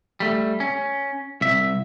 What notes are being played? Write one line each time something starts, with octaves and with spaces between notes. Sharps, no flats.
G3 A3
C#4
C2 E5